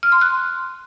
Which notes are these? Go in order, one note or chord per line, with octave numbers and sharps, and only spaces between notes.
F6
C6
F#6